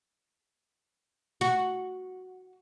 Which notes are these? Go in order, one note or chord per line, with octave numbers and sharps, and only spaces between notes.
F#4